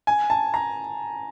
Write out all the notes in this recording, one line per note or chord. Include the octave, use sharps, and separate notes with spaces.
G#5
A5
A#5